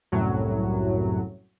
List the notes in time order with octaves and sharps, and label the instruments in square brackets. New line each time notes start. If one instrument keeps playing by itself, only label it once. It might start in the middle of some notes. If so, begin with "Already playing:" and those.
[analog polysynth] C2 F#2 A2 F#3